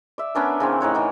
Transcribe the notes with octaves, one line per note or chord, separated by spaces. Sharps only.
D5 E5
B3 C#4 D4 A#4
C#3 E3 C4
A2 D#4 C#5 F#5
D#3 E3